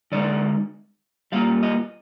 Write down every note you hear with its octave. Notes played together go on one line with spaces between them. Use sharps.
D3 G#3 D#4 D5
G3 A#3 F4 F5
D#5